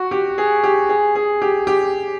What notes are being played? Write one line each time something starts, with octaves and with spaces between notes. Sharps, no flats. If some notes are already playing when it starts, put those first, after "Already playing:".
Already playing: F#4
G4
G#4
G4
G#4
G#4
G4
G4